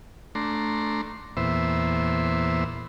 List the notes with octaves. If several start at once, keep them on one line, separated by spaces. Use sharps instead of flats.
A3 D4 A#5 C6
E2 A#2 B3 C5 E5